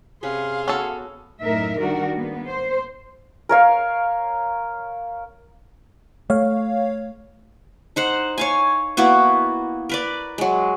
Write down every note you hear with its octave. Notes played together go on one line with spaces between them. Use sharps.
C3 C#4 G#4 B4 F5 C6
B3 C#4 F#4 A4
F#2 A2 D#4 A#4 E5
D#3 G3 D4 F#4 A#4
G#2 A#3 B3
C5
A#4 C#5 F5
A3 C#5 F5
D#4 C5 F#5
C#5 F5 G#5
A#3 B3 E4 F#4
A#4 B4 D5
F#3 G#3